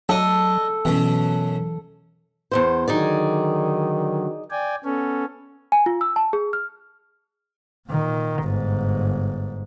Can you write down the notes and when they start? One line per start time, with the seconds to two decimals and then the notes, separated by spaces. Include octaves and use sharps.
0.09 F#3 D4 A4 D#5
0.85 F#2 B2 E3
2.52 E2 G#2 C5
2.88 D3 D#3 F#3 D#4 G#4 D5
4.51 D5 G5 G#5
4.85 B3 C#4 A4
5.72 G#5
5.86 F4
6.01 E6
6.16 A5
6.33 G#4
6.53 F6
7.88 A#2 D#3
8.41 G1 G#2